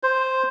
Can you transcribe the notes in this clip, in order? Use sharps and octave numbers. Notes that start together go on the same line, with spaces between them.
C5